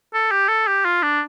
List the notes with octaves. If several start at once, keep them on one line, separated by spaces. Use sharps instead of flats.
A4
G4
A4
G4
F4
D4